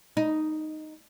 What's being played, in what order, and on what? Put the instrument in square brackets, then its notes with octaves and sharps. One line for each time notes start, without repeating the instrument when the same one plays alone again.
[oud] D#4